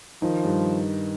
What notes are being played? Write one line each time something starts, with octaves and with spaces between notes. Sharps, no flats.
D#3 F3
G2